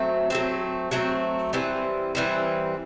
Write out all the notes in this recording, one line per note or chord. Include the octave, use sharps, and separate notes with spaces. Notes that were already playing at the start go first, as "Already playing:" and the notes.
Already playing: F#3 A3 C4
F#3 A3 C4
F#3 A3 C4
E3 G3 C4
E3 G3 C4